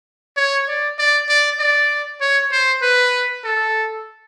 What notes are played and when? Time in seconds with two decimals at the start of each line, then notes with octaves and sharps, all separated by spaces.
0.37 C#5
0.68 D5
0.99 D5
1.29 D5
1.60 D5
2.21 C#5
2.52 C5
2.82 B4
3.44 A4